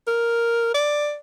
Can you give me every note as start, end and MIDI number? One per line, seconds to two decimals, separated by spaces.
0.07 0.73 70
0.74 1.16 74